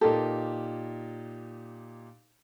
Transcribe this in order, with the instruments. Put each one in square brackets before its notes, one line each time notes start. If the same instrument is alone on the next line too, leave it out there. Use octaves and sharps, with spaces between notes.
[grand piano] A#2 D#4 G4 [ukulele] A4 A#4